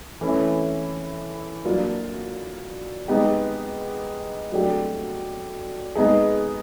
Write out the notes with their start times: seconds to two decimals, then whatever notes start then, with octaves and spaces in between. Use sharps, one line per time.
0.21 E3 A3 C#4 E4
1.65 F#3 A#3 D4 F4
3.08 G#3 B3 D#4 G4
4.52 F#3 A3 D4 G4
5.95 G#3 B3 D#4 G#4